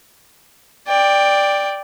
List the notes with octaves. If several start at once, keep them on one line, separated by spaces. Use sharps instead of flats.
D5 G5